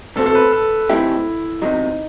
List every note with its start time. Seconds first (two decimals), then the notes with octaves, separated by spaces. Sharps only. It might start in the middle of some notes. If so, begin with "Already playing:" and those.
0.16 B2 A3 C4 F#4 A4 C5
0.26 A4
0.35 B4
0.53 A4
0.89 F#3 A3 C4 D#4 E4 G4
1.62 E2 C3 D#3 F#3 D#4